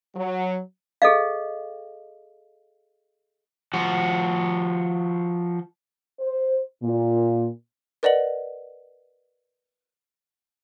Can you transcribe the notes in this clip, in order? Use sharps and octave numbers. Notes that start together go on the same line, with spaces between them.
F#3
G#4 A4 D#5 F5
F3 F#4
C5
A#2
A#4 B4 D5 D#5 F#5 F#7